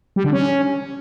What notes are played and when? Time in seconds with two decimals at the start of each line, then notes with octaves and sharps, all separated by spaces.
0.16 G3
0.24 D3
0.32 C#4